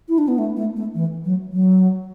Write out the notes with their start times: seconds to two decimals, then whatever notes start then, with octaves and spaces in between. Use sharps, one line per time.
0.09 E4
0.18 D4
0.28 B3
0.38 A3
0.56 A3
0.76 A3
0.95 E3
1.25 F#3
1.53 F#3